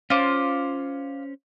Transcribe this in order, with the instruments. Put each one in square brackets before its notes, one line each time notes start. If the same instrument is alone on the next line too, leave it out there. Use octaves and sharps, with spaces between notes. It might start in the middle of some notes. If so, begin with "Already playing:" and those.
[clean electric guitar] C#4 C5 [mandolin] F4 D6